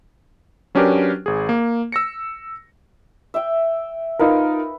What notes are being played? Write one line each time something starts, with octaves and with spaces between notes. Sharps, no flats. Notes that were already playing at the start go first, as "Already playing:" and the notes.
F#3 C#4 D4 G4 A#4 B4
G#1 G#4
A#3
E6 A#6 C#7
E5 G5
D#4 F4 A#4 B4